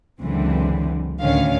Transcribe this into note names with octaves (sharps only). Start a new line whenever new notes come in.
C#2 F#2 D3 E3 C4
D2 A2 D3 D#3 C#4 F5